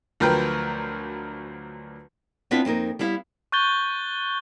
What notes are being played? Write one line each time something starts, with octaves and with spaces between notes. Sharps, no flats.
D2 F3 F#3 A#4 B4 G5
B3 C4 D4 E4 F4 B4
F2 A#3 D#4 A#4
G3 B3 E4 F5
C#6 F#6 G6 A6 G7